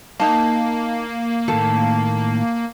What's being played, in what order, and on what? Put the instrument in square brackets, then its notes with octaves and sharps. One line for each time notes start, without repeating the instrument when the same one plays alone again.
[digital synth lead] A#3 [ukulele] D#4 A5
[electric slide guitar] A2 D#3 [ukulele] A4